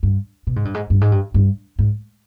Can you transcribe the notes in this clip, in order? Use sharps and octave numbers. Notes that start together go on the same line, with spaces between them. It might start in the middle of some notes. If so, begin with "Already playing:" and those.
G2
B2
G#2
G2
G#2
G2
G#2
G2
G2
G#2